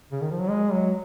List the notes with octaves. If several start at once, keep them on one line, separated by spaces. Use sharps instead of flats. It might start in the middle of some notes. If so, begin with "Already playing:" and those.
C#3
D#3
F3
F#3
G#3
F#3